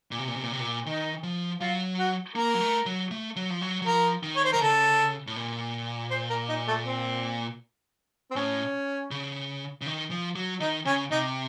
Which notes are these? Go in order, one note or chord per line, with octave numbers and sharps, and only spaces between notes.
A#2
C3
A#2
C3
A#2
C3
A#2
D#3 D#4
F3
F#3 F4
F#4
A#3 A#4
F#3
A3
F#3
A3
F#3
F3
F#3
F#3
F3 A#4
D#3
C#5
C5
D#3 A#4
C#3 A4
A2
A#2
C5
A#4
D#4
A3
C4
C4
A2 C#4
C#3
C#3
D#3
F3
F#3
D#3 D#4
C#3 C#4
C3 D#4